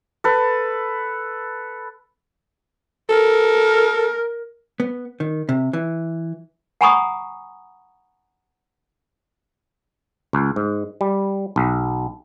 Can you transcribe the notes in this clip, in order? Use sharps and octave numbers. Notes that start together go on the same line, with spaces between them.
A4 B4
A4 A#4
B3
D#3
C3
E3
F#5 G#5 A#5 B5 C#6 D#6
C#2
G#2
G3
B1